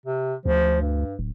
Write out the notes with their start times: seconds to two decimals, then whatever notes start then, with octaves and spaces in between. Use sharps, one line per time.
0.05 C3
0.45 D2 F3
0.81 G2
1.19 D1